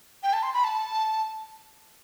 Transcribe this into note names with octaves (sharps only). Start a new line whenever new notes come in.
G5
A5
C6
B5
A5